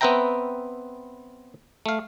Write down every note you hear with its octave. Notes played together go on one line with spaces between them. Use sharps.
B3 C4 B4 E5 G5 A#5
A3 F5